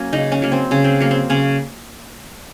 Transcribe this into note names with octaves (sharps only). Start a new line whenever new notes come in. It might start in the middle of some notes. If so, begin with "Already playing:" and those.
Already playing: F#3 A#3 C#4
C#3 D#4
C#4
F#3 A#3
C4
C#3 C#4
C4
F#3 A#3
C4
C#3 C#4